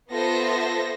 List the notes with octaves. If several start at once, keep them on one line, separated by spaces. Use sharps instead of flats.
B3 F4 A4 C5 E5 A#6